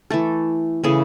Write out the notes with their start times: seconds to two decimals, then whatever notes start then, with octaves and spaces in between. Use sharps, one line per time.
0.10 E3 A3 A4
0.83 C#3 E3 A3 G#4